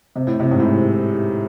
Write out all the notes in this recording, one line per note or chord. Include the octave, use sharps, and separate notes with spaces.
C3
A2
C3
G#2
A2